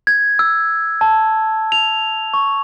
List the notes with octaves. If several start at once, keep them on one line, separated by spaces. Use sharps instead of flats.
G#6
E6
A5
F7
C#6